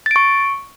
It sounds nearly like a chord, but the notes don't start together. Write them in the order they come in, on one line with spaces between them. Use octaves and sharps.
A6 D7 C#6